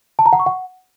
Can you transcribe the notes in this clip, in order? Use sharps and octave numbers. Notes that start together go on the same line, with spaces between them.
A5
A#5
F#5
C#6
F#5